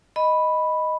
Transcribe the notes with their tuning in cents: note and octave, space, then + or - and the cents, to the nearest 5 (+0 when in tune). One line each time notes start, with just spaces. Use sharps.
D#5 +0 B5 +0